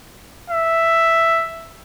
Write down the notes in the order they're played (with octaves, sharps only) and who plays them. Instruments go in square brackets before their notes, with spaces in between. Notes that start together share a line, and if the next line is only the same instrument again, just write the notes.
[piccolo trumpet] E5